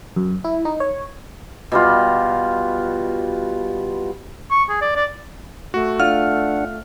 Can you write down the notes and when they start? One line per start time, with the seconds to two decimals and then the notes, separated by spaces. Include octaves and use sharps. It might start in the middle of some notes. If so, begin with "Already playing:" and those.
0.16 F#2
0.44 E4
0.65 D#4
0.80 C#5
1.72 B2 G3 F4
4.51 C#6
4.69 G#4
4.81 D5
4.95 D5
5.74 A3 F#4
6.00 D4 F4 F#5 F6